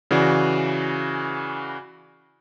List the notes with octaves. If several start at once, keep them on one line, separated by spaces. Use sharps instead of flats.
C#3 E3 F#4 D5